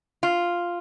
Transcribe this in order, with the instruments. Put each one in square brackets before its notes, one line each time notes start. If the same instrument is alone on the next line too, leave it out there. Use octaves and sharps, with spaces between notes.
[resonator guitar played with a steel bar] F4